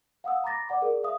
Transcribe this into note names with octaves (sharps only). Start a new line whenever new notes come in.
F5 F#5 D#6 E6
A#5 B5 D6 A6 A#6
D5 F#5 D6
G#4 A#4 D5
E5 F5 D#6